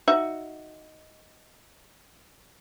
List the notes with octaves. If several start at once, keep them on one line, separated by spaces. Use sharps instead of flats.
D#4 F#4 E5